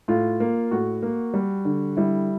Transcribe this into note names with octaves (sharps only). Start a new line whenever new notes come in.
A2 F4
A#3
A2 F#4
A#3
G3
D3
G3 E4